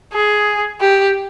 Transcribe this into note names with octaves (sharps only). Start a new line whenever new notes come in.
G#4
G4